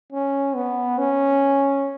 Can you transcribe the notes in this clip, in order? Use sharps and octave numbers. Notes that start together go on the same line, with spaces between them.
C#4
B3
C#4